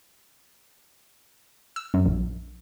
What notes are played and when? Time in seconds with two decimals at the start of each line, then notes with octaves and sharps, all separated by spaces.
1.76 E6
1.94 F#2
2.06 A#1